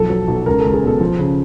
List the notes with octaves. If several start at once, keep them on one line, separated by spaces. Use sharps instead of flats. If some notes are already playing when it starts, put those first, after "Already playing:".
Already playing: B1 F3 A4
F#3
B1
C#2 A#4
A4
C#2
G#4
B2 A4
F3
C#3